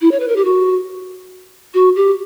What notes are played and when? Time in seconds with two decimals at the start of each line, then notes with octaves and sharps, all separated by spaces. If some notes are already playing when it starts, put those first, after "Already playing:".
0.01 E4
0.11 C#5
0.20 B4
0.28 A#4
0.36 G4
0.45 F#4
1.74 F#4
1.96 G4